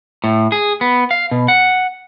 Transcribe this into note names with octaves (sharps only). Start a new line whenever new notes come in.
A2
G#4
B3
F5
B2
F#5